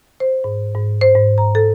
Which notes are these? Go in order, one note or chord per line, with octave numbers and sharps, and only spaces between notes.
C5
G#2
G#2
C5
G#2
A#5
A4